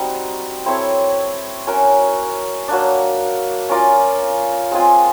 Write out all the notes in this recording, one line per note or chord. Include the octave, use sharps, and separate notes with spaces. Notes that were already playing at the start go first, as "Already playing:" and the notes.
Already playing: G3 C4 D#4 F#4
C4 E4 A4 C#5
C#4 F#4 A#4
F#3 A#3 D4
C#4 F4 A#4 D5
G#3 C4 F4 G#4